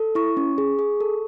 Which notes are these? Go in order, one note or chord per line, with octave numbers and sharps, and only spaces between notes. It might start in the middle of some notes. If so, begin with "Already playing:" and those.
Already playing: A4
E4 C#6
C#4
G#4
G#4
A4